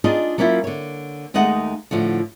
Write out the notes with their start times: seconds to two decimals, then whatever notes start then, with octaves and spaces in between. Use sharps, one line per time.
0.04 D4 D#4 F4 G#4 D#5
0.38 F#3 A#3 C#4 E4 F4
0.64 D3 C#5
1.34 D#2 G#3 A3 D#4 F#5
1.91 A2 D3 F3 F#4